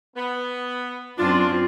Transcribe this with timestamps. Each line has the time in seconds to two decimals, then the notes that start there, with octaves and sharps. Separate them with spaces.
0.16 B3
1.18 F#2 C4 D4 F4